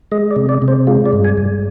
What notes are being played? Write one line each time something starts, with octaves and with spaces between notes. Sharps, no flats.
G#3 D#5
D5
C3
D5
C3
C5
G#3 F4
D5
G2
G#5
G2